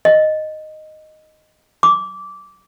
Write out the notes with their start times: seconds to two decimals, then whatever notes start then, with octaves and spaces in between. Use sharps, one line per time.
0.05 D#5
1.83 D6